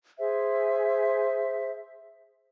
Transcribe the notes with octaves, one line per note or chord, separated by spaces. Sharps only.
G#4 C5 E5